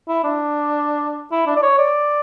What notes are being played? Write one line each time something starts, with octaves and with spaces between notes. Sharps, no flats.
E4
D4
E4
D4
D5
C#5
D5